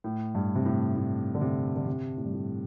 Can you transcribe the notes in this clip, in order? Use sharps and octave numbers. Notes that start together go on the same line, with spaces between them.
A2
G2
C3
A2
A2
D3
C3
D3
C3
A2
G2
A2